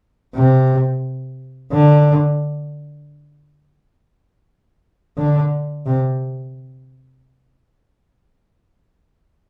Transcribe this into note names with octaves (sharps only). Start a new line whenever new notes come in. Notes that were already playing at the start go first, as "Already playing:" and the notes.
C3
D3
D3
C3